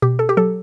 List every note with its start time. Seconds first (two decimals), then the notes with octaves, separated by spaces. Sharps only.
0.02 B2 G4
0.19 A4
0.29 G4
0.37 F#3 A4